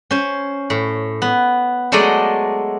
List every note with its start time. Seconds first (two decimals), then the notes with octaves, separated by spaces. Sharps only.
0.11 C#4 C5
0.70 A2
1.22 B3
1.92 F#3 G#3 A3 A4 D5 D#5